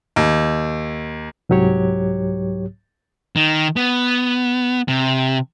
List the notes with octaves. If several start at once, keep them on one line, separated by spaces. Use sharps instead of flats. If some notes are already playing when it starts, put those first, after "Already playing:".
D#2
C2 G#2 F#3 G4 C#5
D#3
B3
C3